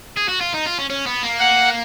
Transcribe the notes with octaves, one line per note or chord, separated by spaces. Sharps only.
G#4
F#4
F4
D#4
F4
C#4
C#4
B3
A#3
F#5